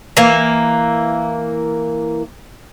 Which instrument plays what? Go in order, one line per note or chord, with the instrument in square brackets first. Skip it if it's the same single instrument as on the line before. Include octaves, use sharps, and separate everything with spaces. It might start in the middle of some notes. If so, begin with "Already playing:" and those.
[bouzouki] E3 A#3